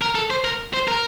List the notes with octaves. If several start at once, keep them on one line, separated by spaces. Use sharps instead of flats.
A#4
A4
C5
A#4
C5
A#4